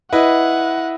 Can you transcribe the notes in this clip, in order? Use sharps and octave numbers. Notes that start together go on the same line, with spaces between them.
E4 B4 D#5 F#5